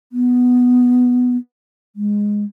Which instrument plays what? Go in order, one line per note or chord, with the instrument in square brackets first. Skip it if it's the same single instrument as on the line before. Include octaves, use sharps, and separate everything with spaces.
[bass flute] B3
G#3